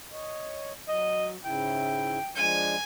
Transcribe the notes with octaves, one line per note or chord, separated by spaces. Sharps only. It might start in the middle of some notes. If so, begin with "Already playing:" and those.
C#5 D#5
F#3 D#5
G#2 C#3 E4 G5
F3 G#3 D4 G#5